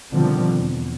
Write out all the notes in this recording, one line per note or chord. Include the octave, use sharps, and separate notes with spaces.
B2 D3 D#3 F3 G3 C4
E2